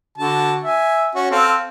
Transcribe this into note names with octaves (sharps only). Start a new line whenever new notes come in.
D3 F#4 A5
E5 G#5
C#4 F#4
C4 A4 F5